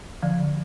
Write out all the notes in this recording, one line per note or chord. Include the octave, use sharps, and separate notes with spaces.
D3 F3